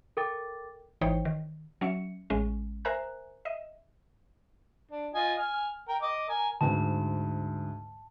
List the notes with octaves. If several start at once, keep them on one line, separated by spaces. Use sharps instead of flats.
A4 A#4 G5 D6 A6
G#1 E3 D#4 C5 C#5 G5
D#3
F#3 C#4 E5 C#7
A1 G#3 C#4
A#4 C5 E5 G#5 A#5 F#6
D#5 E5
D4
F4 D#5 G#5
G#5 F6
A#4 G5
D#5 D6
A#4 G#5
D2 G#2 A5